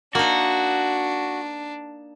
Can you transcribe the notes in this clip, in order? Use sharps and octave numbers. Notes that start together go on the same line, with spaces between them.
A#3 D4 D#4 F#4